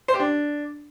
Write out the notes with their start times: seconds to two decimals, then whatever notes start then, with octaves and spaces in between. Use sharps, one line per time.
0.08 C5
0.14 G4
0.20 D4